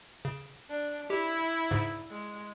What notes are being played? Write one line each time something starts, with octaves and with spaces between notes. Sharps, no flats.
C#3
D4
E4 G4
G#2 C#3
G#3